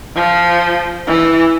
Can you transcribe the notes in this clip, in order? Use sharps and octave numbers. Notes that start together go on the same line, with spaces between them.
F3
E3